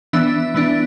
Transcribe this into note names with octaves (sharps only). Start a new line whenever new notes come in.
E3 B3 D4 E5
E3 B3 D4